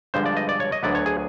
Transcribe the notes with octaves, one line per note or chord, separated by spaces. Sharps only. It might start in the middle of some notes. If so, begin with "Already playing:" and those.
G2 D3 F3 G#3 B3 C5
D5
D#5
D5
C#5
D#5
D2 D3 F#3 B3 D5
C#5
G#4